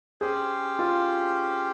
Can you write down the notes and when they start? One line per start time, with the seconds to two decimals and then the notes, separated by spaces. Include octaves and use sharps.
0.21 C#4 G4 G#4 C5
0.79 F4